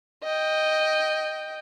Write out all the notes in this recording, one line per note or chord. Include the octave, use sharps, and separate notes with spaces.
D#5 G5